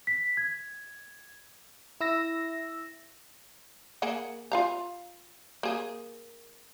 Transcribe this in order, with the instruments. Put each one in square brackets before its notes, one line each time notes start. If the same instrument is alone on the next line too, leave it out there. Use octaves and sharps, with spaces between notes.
[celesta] B6
G#6
[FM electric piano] E4 E6 A#6
[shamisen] A#3 G#4 F#5
F4 F5 A#5
A#3 G#4